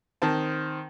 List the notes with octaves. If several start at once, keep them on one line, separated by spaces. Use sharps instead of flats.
D#3 C4 C5 A5